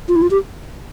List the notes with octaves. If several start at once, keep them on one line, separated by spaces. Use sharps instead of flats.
F4
E4
F4
G4